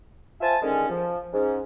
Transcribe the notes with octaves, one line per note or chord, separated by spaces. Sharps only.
F4 C5 E5 G#5 A5
D3 D#3 G#3 C#4
F3
G#2 C#4